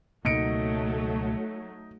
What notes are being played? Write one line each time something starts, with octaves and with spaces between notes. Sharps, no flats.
C#2 B2 F#3 A3 A#3 D#4 C#7 D7